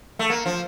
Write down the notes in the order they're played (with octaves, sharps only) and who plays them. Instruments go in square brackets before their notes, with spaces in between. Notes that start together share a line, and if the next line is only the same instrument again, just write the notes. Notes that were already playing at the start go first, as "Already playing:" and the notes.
[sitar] A3
A#3
F3